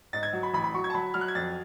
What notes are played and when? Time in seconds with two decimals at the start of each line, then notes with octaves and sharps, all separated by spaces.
0.13 G#2 A6
0.23 G#6
0.33 F#3
0.43 B5
0.53 A1 B5
0.64 B5
0.74 F#3 C#6
0.84 G#6
0.90 A5
0.95 F#3 B5
1.14 F#3 F6
1.21 F#6
1.28 G#6
1.35 F2 A6